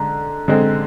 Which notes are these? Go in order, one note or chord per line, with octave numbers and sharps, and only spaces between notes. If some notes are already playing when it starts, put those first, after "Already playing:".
Already playing: D3 G#3 A#5
D3 G#3 C4